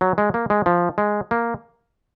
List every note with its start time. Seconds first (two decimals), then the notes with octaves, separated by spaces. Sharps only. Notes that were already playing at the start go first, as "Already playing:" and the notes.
0.01 F#3
0.18 G#3
0.34 A#3
0.50 G#3
0.66 F3
0.98 G#3
1.31 A#3